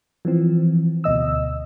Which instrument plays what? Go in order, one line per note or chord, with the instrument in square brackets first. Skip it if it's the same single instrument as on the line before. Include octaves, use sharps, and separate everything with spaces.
[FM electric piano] E3 F3 C4
D2 B2 D#5 E6